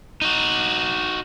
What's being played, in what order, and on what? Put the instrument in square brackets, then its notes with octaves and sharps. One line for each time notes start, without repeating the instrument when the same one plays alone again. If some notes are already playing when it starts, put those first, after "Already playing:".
[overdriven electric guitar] D#4 F#4